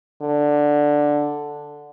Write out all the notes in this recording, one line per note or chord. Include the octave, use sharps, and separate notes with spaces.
D3